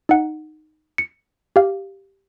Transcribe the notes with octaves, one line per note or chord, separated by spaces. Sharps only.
D#4 F#5
C#7
G4 F5